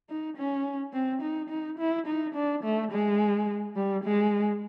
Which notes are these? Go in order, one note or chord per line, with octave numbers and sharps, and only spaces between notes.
D#4
C#4
C4
D#4
D#4
E4
D#4
D4
A3
G#3
G3
G#3